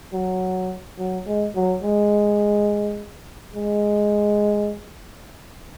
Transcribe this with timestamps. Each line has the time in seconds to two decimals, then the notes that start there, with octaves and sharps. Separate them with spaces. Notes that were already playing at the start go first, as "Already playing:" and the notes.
0.13 F#3
0.98 F#3
1.26 G#3
1.55 F#3
1.83 G#3
3.55 G#3